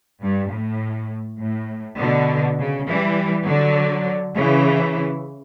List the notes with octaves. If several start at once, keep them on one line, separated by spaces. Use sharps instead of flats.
G2
A2
A2
B2 D3
C#3
E3 G3
D3 F#3
C#3 E3